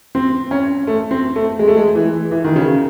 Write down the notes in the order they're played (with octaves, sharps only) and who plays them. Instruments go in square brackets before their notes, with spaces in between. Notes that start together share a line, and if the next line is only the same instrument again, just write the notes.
[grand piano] C4
C#4
A3
C4
A3
G#3
A3
G#3
E3
E3
D#3
C#3